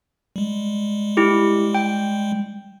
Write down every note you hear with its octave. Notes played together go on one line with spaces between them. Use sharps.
G3 G#3
E4 G4
G5